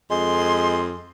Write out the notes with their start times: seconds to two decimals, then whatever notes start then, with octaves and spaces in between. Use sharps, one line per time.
0.11 F2 G#3 C6